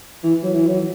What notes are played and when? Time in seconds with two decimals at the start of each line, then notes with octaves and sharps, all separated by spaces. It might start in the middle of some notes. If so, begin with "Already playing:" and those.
0.23 E3
0.43 F#3
0.53 E3
0.67 F#3